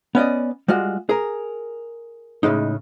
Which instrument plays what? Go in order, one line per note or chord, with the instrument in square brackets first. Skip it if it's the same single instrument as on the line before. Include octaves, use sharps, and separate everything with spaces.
[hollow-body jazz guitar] B3 C#4 D5 D#5
G3 G#3 F4 F#4
G#4 A#4
A2 C#3 G#3 D#4